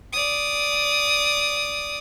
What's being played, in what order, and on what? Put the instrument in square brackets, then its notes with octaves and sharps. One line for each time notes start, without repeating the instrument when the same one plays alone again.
[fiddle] D5 D#6